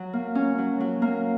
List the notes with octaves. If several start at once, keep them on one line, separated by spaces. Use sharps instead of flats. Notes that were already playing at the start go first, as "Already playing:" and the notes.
Already playing: F#3
A#3
C#4
F#3
F#3
A#3